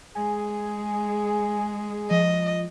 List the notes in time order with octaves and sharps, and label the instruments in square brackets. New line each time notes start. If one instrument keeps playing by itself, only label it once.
[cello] G#3 [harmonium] G#4 [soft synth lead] G#5
[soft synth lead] F3 [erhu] D#5